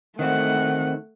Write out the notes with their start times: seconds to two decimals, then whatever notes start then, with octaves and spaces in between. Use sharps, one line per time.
0.19 D#3 A3 C4 F#4 F#5